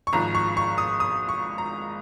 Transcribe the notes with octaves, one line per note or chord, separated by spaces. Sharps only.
C#6
G#1 G#2 F3 A#5
C#6
C#6
D#6
D#6
C#6
A#5